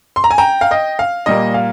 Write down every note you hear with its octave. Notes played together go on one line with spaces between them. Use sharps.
C6
A#5
G#5
G5 A#5
F5
D#5 G5
F5
A#2 G3 A#3 D#5
F5